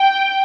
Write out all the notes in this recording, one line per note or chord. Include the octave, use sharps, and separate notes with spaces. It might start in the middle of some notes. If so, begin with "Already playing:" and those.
Already playing: G5